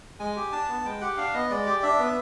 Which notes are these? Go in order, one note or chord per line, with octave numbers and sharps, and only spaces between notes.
G#3 G#5
G4
D4 A5
B3
G#3 G5
G4 F#5
D4 F5
B3 D#5
G#3 D5
G4
D4 E5
B3